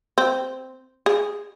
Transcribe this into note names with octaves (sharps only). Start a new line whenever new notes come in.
C4
G#4